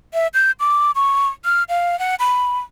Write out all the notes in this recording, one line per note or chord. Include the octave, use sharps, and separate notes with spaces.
E5
G6
D6
C#6
F6
F5
F#5
B5